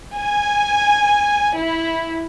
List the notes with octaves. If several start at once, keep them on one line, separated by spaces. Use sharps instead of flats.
G#5
E4